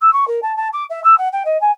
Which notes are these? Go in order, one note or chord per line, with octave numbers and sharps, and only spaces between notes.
E6
C#6
A#4
A5
A5
D6
E5
E6
F#5
G5
D#5
G#5